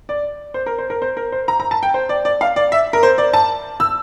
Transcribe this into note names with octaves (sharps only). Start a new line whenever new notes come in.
D5
C5
A#4
C5
A#4
C5
A#4
C5
A#5
A#5
A5
G5
C5
D5
D5
F5
D5
E5
A#4
C5
D5
A5
E6